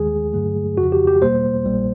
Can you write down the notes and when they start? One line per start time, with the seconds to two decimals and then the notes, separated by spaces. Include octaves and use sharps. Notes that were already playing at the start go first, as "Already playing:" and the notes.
Already playing: D#2 D#3 G#3 G#4
0.33 G2 D3 F#3 A3
0.78 F2 C#3 F3 F#4
0.92 G4
1.07 G4
1.21 E2 B2 G3 A#3 C5
1.65 A#1 A#2 G3 A#3